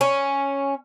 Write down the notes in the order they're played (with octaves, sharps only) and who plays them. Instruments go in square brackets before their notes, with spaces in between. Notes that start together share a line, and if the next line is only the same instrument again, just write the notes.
[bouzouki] C#4